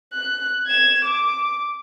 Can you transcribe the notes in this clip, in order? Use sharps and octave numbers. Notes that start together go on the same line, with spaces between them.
F#6
G#6 E7
D6